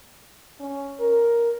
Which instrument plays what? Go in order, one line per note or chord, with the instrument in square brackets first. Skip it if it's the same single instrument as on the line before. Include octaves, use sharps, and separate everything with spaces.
[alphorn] C#4
A#4